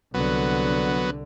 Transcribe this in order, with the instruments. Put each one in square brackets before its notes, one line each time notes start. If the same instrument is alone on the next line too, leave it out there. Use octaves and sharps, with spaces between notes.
[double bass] C2 D3 [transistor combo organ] F#3 B3